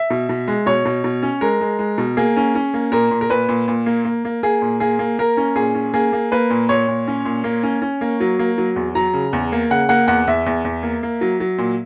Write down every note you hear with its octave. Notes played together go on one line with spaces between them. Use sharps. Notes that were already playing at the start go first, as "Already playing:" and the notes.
Already playing: E5
B2
B2
G#3
B2 C#5
B2
B2
C#4
G#3 A#4
G#3
G#3
B2
A#3 G#4
C#4
C#4
A#3
A#2 A#4
A#2
A#4
A#2 B4
A#2
A#2
A#3
A#3
A#3
A#3 G#4
A#2
A#3 G#4
A#3
A#3 A#4
C#4
A#2 G#4
C#4
A#3 G#4
A#3
A#3 B4
A#2
A#2 C#5
A#2
C#4
A#2
A#3
C#4
C#4
A#3
F#3
A#3
F#3
E2
F#3 A#5
C#3
E2
A#3
C#3 F#5
A#3 F#5
E2 F#5
E2 E5
E2
E2
A#3
A#3
F#3
F#3
A#2